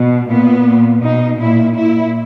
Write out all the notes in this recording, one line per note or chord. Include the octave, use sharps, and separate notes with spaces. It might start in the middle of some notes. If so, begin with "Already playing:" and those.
Already playing: B2
A#2 B3
A#2
B2 D#4
A#2 E4
A#2 E4